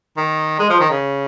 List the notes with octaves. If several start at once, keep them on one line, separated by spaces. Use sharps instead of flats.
D#3
G#3
F3
D#3
C#3